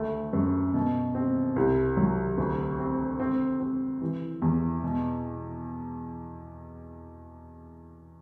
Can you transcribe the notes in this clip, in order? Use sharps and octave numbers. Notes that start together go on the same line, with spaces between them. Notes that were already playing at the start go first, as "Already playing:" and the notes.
Already playing: D2 A3
F#2
B2
C4
C2
F#3
D2
C4
C4
C4
E3
E2
B2